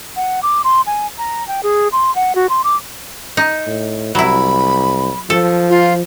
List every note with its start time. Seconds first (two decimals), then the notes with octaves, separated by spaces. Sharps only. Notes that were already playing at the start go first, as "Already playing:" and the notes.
0.16 F#5
0.43 D6
0.64 C6
0.87 G#5
1.18 A#5
1.48 G5
1.63 G#4
1.92 C6
2.15 F#5
2.35 F#4
2.50 C6
2.64 D6
3.37 D#4
3.67 A2
4.15 C2 F#3 E4 B5
5.30 F3 A4
5.70 F4